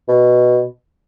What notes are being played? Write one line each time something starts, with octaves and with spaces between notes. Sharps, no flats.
B2